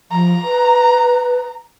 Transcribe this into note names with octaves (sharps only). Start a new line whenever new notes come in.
F3 A#5
B4